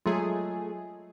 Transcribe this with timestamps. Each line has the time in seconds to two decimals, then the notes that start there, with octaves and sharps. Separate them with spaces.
0.06 F#3 G#3 A3 F4 G#4